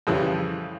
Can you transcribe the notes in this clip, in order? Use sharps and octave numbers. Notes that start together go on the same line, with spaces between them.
F2 C#3 E3 G3